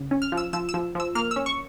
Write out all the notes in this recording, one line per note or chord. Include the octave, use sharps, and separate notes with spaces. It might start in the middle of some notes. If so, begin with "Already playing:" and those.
Already playing: C#3
C#4
F6
F3
E6
F3 E6
E6
F3
F3 E6
A#3 F6
E6
C#4
C#6